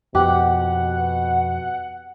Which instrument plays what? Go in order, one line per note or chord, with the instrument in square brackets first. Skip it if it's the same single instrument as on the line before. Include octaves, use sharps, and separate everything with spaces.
[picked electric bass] F2 [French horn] B2 [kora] G4 [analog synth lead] F#5